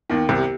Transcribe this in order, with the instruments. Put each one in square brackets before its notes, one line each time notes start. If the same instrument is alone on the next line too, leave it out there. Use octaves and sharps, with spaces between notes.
[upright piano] D#2 D#3 [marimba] B3
[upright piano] C2 C3
[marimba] G4